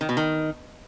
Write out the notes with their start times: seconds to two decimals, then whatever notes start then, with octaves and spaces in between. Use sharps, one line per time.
0.01 D#3
0.09 B2
0.17 D#3